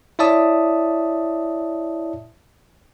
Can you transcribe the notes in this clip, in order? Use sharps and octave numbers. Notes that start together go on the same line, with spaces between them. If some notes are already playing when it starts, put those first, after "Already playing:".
E4 C#5 D5 E5 A5 D#6